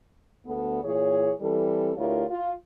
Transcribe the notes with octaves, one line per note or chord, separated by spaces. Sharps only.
D2 B3 A4
A#2 E3 G#4 C#5
E3 G3 C4 A4
D2 E4 F4 G4 A#4 C#5
F4